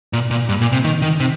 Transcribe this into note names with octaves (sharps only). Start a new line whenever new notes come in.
A#2
A#2
G2
A#2
C3
D#3
D#3
C3